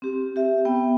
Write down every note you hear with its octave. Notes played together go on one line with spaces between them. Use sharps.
C4 G4
G4 E5
B3 G5